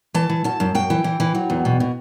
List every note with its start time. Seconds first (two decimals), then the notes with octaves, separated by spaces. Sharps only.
0.14 E3 A5
0.29 E3
0.44 F#2 A5
0.60 F#2
0.75 F#2 G5
0.90 E3
1.04 E3
1.20 E3
1.35 F#3
1.50 E2
1.65 B2
1.80 B2